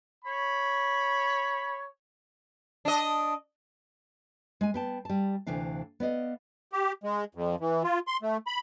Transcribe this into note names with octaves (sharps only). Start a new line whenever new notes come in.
C#5 B5
D4 D#5
G#3 G#5
B3 G5 A5
G3 A5
D2 C3 E3 D4 F5
B3 D5 D#5 F5
G4
G#3
F2
E3
F4
C6
A3
B5